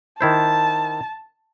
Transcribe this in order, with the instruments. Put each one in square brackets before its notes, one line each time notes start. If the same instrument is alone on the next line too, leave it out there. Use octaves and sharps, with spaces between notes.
[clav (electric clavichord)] D#3 E4 C5 [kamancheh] A5